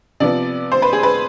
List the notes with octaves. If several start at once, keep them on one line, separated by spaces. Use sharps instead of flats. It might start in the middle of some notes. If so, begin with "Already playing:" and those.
C3 F3 B3 D5
C5
B4
G#4
B4